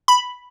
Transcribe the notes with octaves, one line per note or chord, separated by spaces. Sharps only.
B5